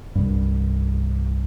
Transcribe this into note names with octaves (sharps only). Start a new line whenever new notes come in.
C2 G2